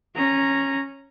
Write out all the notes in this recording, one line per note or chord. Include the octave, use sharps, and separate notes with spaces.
C#4 A#5